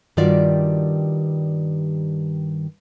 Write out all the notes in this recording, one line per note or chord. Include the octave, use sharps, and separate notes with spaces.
G2 D#3 G3 F4 F#4 D5